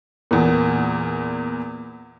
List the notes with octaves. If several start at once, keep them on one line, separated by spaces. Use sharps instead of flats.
E2 A#2